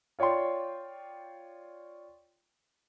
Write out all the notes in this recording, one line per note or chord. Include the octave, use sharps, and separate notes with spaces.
F4 C#5 D5 G5 C6